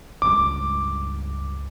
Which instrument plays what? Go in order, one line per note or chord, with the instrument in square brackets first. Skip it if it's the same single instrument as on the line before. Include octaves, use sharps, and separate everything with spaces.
[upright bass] C#2 G2 [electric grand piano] D6